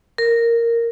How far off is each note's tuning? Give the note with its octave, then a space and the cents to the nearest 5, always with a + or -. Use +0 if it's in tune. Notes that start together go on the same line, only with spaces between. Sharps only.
A#4 -5